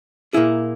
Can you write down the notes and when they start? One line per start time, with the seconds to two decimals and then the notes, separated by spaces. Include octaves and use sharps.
0.33 A#2 A#3 E4 G#4